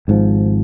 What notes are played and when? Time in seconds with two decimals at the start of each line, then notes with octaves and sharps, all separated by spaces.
0.08 G#1 G#2 F3